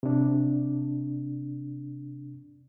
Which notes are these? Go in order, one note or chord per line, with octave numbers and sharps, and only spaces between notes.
C3 D4